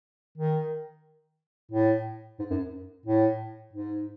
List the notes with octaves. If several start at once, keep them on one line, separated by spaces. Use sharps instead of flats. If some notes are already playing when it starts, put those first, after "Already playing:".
D#3
A2
G#2
F#2
A2
G#2